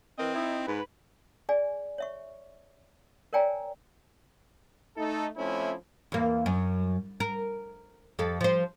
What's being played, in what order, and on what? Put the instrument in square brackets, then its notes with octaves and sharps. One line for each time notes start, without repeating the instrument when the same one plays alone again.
[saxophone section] E3 A#4 D#5 [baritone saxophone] C4
[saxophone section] D#4 E4
[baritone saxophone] G#2 [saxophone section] B4
[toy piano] G#4 D5 G#5
C#5 E5 C#6
A#4 C#5 D5 G5 G#5 A#5
[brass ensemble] A3 D#4 A4
F3 A3 C4 C#4 E4
[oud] E2 A#3
F#2
A#4
F2 A4
F3 C5